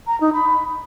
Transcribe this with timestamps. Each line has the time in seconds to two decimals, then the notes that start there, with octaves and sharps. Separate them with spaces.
0.07 A#5
0.21 D#4
0.34 B5